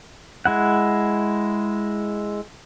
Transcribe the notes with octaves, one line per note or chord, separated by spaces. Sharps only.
G#3 E4 F#5